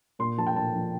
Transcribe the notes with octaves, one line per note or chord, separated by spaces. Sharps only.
A#2 C6
F3 A5
G5
A#2 A5
F3